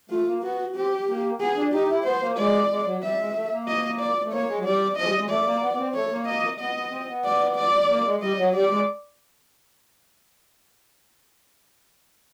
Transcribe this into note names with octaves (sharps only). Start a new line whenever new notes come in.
A3 F4
A#3
B3 F#4
C4 G4
A#3
B3 G#4
D4
D#4 G4
E4
B3 C5
A#3
G#3 D5
G#3
F#3
G3 E5
G#3
A3
A#3
D#5
D5
A3
A#3 C#5
G#3
F#3
G3 D5
F3 D#5
G#3
G3
G#3
A3 D5
A#3
B3
B3
C4
A3 C#5
A#3
D#5
B3 D#5
B3
C4
B3
D5
D5
A#3
G#3
G3 D#5
F#3
G3 D5
G#3